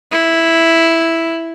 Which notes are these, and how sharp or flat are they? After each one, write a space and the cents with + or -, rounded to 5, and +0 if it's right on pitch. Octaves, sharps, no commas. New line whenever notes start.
E4 +0